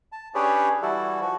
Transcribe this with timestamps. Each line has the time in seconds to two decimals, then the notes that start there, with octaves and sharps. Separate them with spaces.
0.12 A5
0.35 C#4 D4 G4 G#4 B4 C#5
0.82 E3 G3 E4 F#4 A4
1.20 F3 F#4